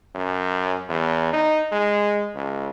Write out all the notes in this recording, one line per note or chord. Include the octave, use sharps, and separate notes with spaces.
F#2
E2
D#4
G#3
C#2